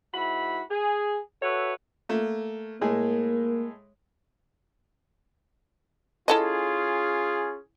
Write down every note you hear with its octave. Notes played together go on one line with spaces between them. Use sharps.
G#2 E4 F#4 B5
G#4
F#4 A4 B4 C#5 E5
A3 A#3
A2 G#3 A#3 G#4
C#4 E4 F4 G#4 A4 D#5